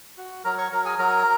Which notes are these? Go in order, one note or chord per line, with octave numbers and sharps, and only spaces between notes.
F#4
F#3 A#4 A#5
C#5 C#6
F#3 A#4 A#5
G#4 G#5
F#3 A#4 A#5